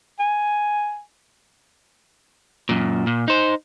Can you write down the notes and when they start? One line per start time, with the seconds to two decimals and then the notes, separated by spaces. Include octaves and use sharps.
0.20 G#5
2.69 F#2 A#2
3.07 A#2
3.28 D#4 C5